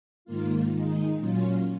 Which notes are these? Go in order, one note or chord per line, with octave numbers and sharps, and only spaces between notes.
G#2 D#3 A#3 F4
D#3 G#3 D#4
A#2 F#3 C#4 F4